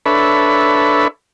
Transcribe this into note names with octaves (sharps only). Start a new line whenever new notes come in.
D4 A4 B4 C#5 E5 B5